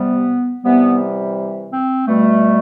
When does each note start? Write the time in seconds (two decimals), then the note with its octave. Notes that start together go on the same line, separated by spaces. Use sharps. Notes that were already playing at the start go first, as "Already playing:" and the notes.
Already playing: C3 G3 B3
0.63 C3 E3 G3 B3
1.71 C4
2.07 B2 G3 A3